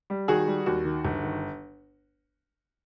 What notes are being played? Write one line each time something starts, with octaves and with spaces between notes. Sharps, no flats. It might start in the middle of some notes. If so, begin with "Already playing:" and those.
G3
D#3 F#4 G#4
G3
D#2 F#4
D#3
G1
D#3